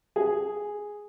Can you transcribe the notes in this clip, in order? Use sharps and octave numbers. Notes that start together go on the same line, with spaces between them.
G#4